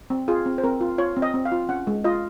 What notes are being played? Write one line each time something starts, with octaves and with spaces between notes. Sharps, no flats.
C4
F4 G#4
C4
C5
C4 A#4
F4
F4 C#5
C4
D#5
C4
F5
F4
C#4 F#5
G#3
F4 D#5